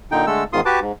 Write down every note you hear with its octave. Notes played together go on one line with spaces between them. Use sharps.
A#2 D3 D#4 G5
D3 G#3 A3 A4 E6
E2 G#2 D#3 F4 C6 D#6
F#4 G4 B4 A5 D6
G#2